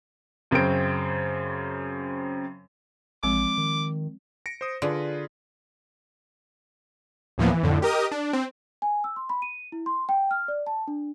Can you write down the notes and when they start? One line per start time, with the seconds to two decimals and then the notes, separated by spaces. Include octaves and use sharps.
0.51 F#2 C#3 C4 C5 D7
3.23 A1 F3 G#3 C4 D6
3.58 D#3
4.46 A#6 C#7 D7
4.61 C5 D#6
4.82 D3 F4 G#4 B4
7.38 D2 A2 E3 F3 A#3 B3
7.50 E3
7.63 F2 A2 D3
7.82 G4 A#4 D#5 D#6
8.12 D4
8.33 C4
8.82 G#5
9.04 E6
9.16 C6
9.29 B5
9.42 D#7
9.72 E4
9.86 C6
10.09 G5
10.31 F6
10.48 D5
10.67 A5
10.88 D4